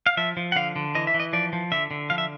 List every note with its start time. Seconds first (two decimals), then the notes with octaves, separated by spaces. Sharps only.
0.06 F5
0.17 F3 E5
0.37 F3
0.52 F#5
0.56 D3 F5
0.76 D3
0.95 E3 D#5
1.07 E5
1.14 E3
1.20 D#5
1.33 F3 D5
1.53 F3
1.72 D3 E5
1.91 D3
2.10 F3 F5
2.18 E5